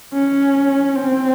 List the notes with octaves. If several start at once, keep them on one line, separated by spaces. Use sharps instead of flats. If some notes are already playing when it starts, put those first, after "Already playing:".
C#4
C4